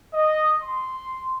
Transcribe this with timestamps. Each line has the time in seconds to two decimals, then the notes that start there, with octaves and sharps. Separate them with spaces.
0.14 D#5
0.63 C6